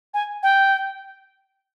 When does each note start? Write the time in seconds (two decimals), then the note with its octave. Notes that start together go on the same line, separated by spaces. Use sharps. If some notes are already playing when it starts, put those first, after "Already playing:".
0.14 G#5
0.43 G5